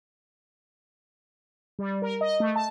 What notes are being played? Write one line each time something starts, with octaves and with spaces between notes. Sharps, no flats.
G3
A#4
D#5
A3
A5